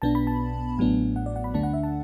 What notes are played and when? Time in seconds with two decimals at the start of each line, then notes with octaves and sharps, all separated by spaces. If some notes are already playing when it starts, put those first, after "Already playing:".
0.02 B1 B2 B3 D4 A5
0.15 B5
0.27 A5
0.78 A1 A2 F#3 B3 D4
1.16 F#5
1.26 D5
1.36 F#5
1.44 B5
1.54 D2 D3 A3 D4 A5
1.63 F#5
1.74 E5
1.83 A5